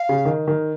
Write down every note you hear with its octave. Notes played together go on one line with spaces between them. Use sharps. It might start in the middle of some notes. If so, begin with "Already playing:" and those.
Already playing: F5
C#3
D#3
D#3